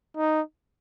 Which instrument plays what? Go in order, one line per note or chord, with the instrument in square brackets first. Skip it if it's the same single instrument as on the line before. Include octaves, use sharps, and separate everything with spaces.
[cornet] D#4